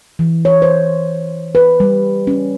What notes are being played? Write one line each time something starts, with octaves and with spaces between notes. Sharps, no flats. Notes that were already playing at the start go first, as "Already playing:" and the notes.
E3
C#5
C5
B4
G3
C#4